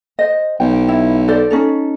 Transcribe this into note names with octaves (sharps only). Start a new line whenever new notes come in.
C5 D#5
B1 G5
E4
A4 C5 D5
C#4 D#4 A4